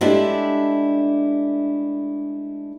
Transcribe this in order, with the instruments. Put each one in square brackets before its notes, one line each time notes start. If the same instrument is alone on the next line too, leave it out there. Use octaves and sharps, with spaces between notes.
[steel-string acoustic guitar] G#3 A3 D4 E4 G4 D5